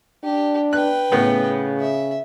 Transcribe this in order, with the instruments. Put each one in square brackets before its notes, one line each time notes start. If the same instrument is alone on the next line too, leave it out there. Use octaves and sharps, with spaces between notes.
[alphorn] D4 [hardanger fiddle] G4
[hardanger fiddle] B4 G5 [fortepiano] F#6
[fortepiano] A2 B3 [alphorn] C#3
[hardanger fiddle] E5